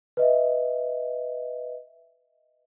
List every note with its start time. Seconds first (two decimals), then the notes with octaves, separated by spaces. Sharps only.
0.17 B4 D#5 E5